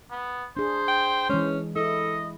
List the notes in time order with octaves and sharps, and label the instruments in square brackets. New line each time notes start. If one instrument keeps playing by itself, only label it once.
[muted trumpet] B3
[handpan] D4 G#4 [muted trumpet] C5
[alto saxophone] G5
[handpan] E3 G#3 [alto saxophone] C#4
[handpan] E4 [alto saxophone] A4 [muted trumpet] D#5